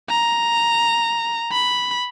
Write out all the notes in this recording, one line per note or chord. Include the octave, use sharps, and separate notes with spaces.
A#5
B5